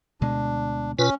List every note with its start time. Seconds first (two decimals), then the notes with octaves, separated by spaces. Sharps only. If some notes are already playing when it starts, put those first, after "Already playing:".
0.21 D2 B2 G#3 D4
0.99 B2 C#4 F4 B4